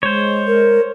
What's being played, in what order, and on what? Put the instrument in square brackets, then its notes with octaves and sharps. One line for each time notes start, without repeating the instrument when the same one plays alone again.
[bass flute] G#3 [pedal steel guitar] C5 C#5
[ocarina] A#4